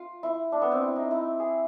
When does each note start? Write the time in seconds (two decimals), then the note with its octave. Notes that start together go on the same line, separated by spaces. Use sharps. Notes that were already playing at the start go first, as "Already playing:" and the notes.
Already playing: F4
0.23 E4
0.52 D4
0.62 B3
0.72 C4
0.81 E4
0.96 D#4
1.11 E4
1.40 G#4